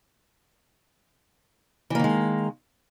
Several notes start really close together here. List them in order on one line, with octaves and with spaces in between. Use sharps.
E3 A#3 D#3 G#3